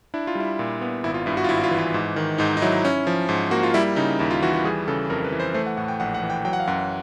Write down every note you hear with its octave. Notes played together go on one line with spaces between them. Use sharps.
D4 E4
F4
G3 E4
A#2
B3
G#1 E4
F4
G2 E4
F#4
F4
G#1 E4
F4
E3
F4
G#2
D#3
G#2 D#4
D#4
F#3 E4
C#4
F3
G#2
A#3 F#4
F4
G3 E4
C#3 D#4
D#2 E4
F4
E3 F#4
F#4
G3 G#4
C#3 A4
F2 A#4
B4
E3
C5
A3 C5
F#5
A2 F#5
G5
A#1 F#5
F#5
E3
G5
F#3 G5
F#5
F5
F#2 F#5